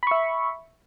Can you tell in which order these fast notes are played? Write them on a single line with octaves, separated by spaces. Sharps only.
B5 C#6 E5